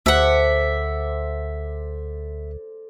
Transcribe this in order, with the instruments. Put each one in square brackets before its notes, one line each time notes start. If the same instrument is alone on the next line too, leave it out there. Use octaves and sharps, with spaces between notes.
[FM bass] D2 [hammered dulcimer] A4 C5 D5 [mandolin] E5 F#5